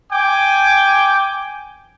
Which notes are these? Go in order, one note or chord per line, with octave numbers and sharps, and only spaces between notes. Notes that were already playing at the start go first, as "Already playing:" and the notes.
G5 G#5 D6